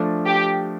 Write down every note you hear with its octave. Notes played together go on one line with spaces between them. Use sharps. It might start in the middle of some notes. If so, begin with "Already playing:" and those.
Already playing: F3 A3 D4
G4